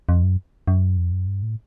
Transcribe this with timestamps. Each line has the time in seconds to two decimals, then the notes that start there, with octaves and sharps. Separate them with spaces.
0.09 F2
0.23 F#2
0.68 F#2
0.97 F2
1.12 F#2
1.27 G2
1.43 A2